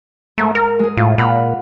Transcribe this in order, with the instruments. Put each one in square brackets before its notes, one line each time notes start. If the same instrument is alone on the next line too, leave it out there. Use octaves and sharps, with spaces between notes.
[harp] G#2 A#4 [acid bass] A3
[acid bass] A#4 [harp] F6
[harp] G#3 G#4
[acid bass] A2 [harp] F4
[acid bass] A#2 [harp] F#5 B5 F6